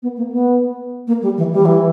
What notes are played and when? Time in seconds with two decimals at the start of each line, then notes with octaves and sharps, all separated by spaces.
0.02 B3
0.17 A#3
0.32 B3
1.07 A#3
1.22 G3
1.37 E3
1.52 G3
1.65 E3